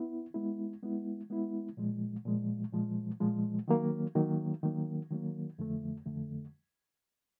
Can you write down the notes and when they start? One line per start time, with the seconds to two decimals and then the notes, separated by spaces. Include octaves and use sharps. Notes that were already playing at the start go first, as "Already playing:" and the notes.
Already playing: B3 E4
0.34 G#3 B3 E4
0.83 G#3 B3 E4
1.30 G#3 B3 E4
1.77 A#2 F3 G#3
2.25 A#2 F3 G#3
2.72 A#2 F3 G#3
3.20 A#2 F3 G#3
3.68 D#3 F#3 A#3
4.15 D#3 F#3 A#3
4.63 D#3 F#3 A#3
5.11 D#3 F#3 A#3
5.59 F2 D3 F3 A3
6.06 F2 D3 F3 A3